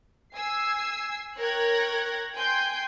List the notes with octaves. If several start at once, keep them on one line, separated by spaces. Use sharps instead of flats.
G#5 E6 C7
A#4 C#5 G5 F#6 G#6 A#6
G5 G#5 C6 G6